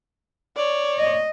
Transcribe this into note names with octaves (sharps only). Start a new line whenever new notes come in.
C#5 D5
D#5